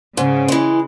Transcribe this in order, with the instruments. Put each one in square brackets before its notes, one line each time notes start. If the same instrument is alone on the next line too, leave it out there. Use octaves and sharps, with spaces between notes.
[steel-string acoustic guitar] G#2 [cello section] C#3
[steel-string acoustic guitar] E3 G#3